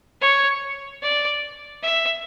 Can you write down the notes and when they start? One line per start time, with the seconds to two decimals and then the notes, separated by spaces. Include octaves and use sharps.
0.21 C#5
1.02 D5
1.82 E5